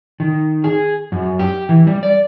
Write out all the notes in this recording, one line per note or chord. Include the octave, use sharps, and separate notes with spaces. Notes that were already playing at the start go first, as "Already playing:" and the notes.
D#3
G#4
F#2
G4
E3
G3
D5